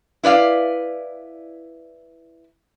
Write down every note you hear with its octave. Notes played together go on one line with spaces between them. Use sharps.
E4 B4 D5 F5